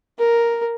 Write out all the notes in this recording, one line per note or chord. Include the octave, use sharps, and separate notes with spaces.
A#4